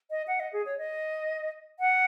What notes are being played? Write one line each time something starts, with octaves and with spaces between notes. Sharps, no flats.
D#5
F#5
D#5
G#4
C#5
D#5
F#5